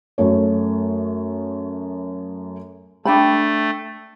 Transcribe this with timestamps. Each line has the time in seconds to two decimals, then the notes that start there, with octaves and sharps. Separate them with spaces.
0.18 F#2 A3 C#5
3.05 A3 D4 G5 B5